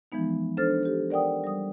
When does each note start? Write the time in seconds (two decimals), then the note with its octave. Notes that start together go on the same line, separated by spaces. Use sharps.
0.12 E3 F3 G#3 B3 D#4
0.57 D4 A4 C5 F6 A6
0.83 G4 A4
1.10 A#4 D5 F#5 G5 D#6
1.44 G3 D#6